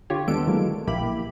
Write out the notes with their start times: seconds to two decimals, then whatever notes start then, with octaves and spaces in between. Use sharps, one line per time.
0.10 D3 F4 G4 C#5
0.28 D#2 G#3 B3 D4 A4 D7
0.47 D3 E3 F#3 G#3 A#3
0.87 A#1 A#3 E4 G4 B5